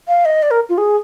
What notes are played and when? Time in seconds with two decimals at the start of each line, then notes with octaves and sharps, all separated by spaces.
0.08 F5
0.25 D#5
0.43 D5
0.51 A#4
0.69 F4
0.78 G#4